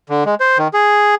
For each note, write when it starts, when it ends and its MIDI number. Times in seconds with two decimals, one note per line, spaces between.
0.10 0.24 50
0.26 0.35 56
0.40 0.58 72
0.58 0.68 51
0.74 1.15 68